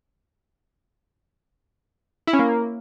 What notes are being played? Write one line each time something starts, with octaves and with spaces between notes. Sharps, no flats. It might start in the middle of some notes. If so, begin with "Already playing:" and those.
E4
C#4
A#3